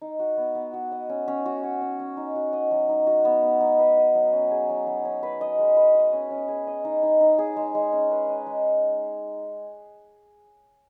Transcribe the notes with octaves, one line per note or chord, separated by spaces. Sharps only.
D#4
F#4
B3
B3
F#4
D#5
C#4
C#4
F#4
C#5
C#4
C#4
D#4
F#4
D#5
F#3
D#4
F#4
B3
B3
D#4
B4
D#5
F#3
C#4
G#4
F#3
F#3
C#4
B4
D#5
G#3
B4
D#5
C#4
C#4
G#4
D#5
D#4
D#4
D#4
G#4
G#3
G#3
C#4
B4
D#5
G#3